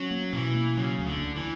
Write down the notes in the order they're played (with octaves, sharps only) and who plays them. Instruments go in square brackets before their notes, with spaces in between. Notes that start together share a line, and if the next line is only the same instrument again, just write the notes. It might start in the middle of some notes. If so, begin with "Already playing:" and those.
Already playing: [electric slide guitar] F#3 [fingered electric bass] C#4
[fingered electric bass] A#3
[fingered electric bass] B2 [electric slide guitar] E3
[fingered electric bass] A#3
[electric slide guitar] C#3 [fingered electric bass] F#3
[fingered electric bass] D2
[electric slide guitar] D3
[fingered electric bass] D2
[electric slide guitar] E3